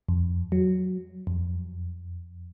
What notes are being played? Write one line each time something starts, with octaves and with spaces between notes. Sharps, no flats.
F2
F#3
F2